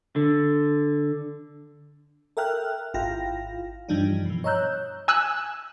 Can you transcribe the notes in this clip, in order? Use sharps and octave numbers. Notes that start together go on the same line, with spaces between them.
D3
A4 A#4 E5 G5 F6 F#6
G#1 E4 F4 F5 G5 A#6
G2 E3 F3 G3 D4 D#4
B2 E3
C#5 D#5 A#5 E6 F#6 G6
G#5 E6 F#6